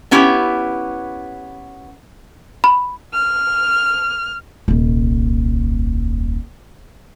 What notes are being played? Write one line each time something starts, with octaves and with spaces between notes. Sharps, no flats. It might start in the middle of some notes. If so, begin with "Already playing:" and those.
B3 C#4 E4 G4
B5
F6
D#1 C2